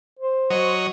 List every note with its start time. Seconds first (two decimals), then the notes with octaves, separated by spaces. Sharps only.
0.19 C5
0.50 F#3 C#5 D#5